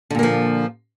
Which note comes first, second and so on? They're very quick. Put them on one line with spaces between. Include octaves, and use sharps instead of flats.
D3 A#2 A#3 F3